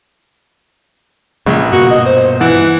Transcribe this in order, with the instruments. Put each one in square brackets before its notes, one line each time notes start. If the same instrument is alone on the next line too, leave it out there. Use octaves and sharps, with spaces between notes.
[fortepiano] A#1 [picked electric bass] G2 C#3 G#3
[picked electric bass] G2 B2 A#3 [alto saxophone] F#4
[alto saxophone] D#5
C5
[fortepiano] E3 [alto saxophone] F#5